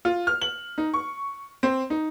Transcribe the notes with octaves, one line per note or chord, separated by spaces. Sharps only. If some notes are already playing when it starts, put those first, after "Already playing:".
F4
F6
F#7
D#4
C#6
C4
D#4